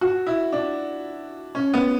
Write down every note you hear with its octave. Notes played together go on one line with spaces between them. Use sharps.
F#4
E4
D4
C#4
B3